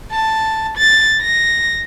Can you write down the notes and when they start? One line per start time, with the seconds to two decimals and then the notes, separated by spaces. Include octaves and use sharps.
0.12 A5
0.77 A6
1.21 A#6